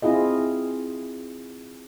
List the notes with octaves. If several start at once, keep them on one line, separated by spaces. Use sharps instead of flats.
C4 E4 F4 G#4 D#5